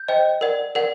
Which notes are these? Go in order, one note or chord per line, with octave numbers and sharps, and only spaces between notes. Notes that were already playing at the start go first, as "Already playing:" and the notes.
Already playing: G6
C5 D#5 G5
A#4 D5 F#5
A#4 D5 F#5